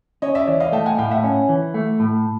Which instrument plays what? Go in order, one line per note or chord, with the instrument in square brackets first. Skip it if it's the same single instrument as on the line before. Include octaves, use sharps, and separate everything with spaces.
[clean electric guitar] C#4 [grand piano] C#5 D#5
[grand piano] D5 E5
[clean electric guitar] E3 [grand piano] D5 E5
[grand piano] D#5 F5
[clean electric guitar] A3 [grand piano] G5 A5
[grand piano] F#5 G#5
[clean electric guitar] A2 [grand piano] F5 G5
[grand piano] E5 F#5
[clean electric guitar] C#4
E3
A3
A2